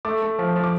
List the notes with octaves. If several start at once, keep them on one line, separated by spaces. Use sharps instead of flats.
A3 D6
A3
F3
F3
D6